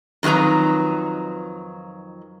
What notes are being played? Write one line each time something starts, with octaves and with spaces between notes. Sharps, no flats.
F2 D#3 F#3 B4 A#5